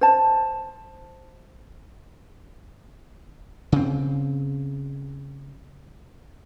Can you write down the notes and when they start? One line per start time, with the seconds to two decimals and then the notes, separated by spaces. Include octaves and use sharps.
0.01 C5 A5
3.72 C#3 C4